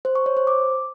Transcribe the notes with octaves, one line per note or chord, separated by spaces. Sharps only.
C5
C#6
C#5
C5
D6